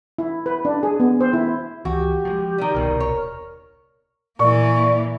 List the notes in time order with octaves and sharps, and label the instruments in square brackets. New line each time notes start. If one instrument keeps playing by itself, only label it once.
[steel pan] E4
B4
D4
G#4
B3
C5
E4
[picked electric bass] C#2 E3 [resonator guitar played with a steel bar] F#4 [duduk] G4
[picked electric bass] F3 F#3 G#3
[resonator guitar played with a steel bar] D#3 G3
[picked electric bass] D#1 C2 B2 [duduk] A#4
[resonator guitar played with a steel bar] C#5
[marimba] A#2 [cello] E3 A#3 [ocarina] D5 [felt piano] C#6